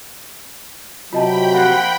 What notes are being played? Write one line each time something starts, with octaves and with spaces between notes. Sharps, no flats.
C3 F#3 F4 D#5 G5 A5 B5
F3 A#3 F#5